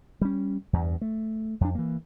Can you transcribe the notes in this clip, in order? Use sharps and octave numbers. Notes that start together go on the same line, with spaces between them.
G3 C#4
E2 G2
A3
F2 D4
E3 A#3